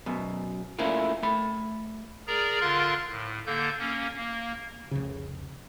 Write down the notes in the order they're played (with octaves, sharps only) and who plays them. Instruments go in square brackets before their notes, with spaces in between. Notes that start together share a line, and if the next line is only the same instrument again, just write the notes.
[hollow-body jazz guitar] F#2 B2
A3 A#3 C#4 E4 F4
A3 B5
[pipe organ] G#4 A#4 D5 A#5
D3 F4 A#4 F5 C6 F#6
A2
D3 A#3 A4 G6
A#3 C#4
A#3
[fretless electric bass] F1 C2 C#3